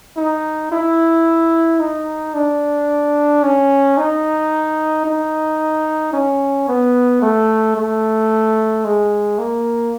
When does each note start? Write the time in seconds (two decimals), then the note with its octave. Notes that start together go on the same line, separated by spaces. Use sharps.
0.17 D#4
0.72 E4
1.79 D#4
2.34 D4
3.43 C#4
3.97 D#4
5.06 D#4
6.13 C#4
6.68 B3
7.22 A3
7.76 A3
8.85 G#3
9.38 A#3